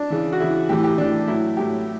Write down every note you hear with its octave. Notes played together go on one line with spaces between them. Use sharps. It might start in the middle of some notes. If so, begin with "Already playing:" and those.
Already playing: D4
C#3 E3
F#4
C#3 E3 E4
A2 E3 G4
G4
A2 E3 D4
A2 F#3 E4
A2 F#3 G4